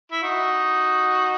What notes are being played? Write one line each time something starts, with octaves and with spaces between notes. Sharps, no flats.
E4
D#4 F#4